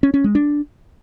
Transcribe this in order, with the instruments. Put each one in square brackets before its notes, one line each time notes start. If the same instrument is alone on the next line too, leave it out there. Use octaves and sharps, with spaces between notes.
[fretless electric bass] C#4
C#4
G#3
D4